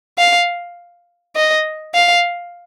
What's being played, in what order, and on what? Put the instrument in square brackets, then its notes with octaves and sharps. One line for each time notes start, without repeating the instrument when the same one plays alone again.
[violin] F5
D#5
F5